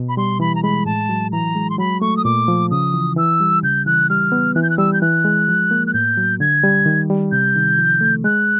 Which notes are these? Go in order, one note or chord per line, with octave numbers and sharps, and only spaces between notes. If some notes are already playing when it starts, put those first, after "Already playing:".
Already playing: B2
B5
G3 C6
E3 B5
A#5
G#3 B5
A2 A5
F#3
E3 A#5
G#3
C6
F#3 B5
A3 C#6
D#6
A#2 D6
F3
C#3 D#6
E3
E3 E6
G3
C#3 G6
E3 F#6
G3 F6
B3
E3 F#6
G6
F#6
G3 E6
G6
E3 F#6
G#3
F3
A#3
F#6
A2 G6
F#3
D3 G#6
G3
D#3
G3
C3 G6
D#3
F3
A3
G#3 F#6